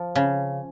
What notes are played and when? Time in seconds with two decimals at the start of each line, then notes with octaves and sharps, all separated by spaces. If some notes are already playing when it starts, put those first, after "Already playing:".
Already playing: F3
0.15 C#3